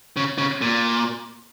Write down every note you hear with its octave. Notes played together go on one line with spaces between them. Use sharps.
C#3
C#3
A#2